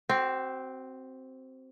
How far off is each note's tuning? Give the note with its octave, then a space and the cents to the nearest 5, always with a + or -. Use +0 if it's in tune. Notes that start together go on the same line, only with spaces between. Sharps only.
C4 +0 F#4 +35